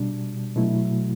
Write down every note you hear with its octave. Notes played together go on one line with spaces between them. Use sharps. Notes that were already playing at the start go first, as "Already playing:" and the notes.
Already playing: B2 G3 D4
B2 F#3 A3 E4